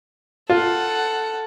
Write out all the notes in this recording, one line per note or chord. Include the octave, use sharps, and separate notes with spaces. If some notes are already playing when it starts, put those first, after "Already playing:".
F4 A4 F#5